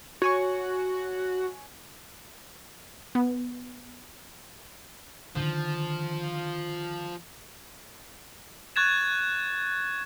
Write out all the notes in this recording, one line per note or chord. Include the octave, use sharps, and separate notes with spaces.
F#4 C#5 G#5 C#6
B3
D3 D#3 F3
C#6 F#6 G#6 A6 E7